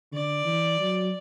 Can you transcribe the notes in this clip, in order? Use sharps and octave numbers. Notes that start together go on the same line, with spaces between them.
D3 D5
E3
F#3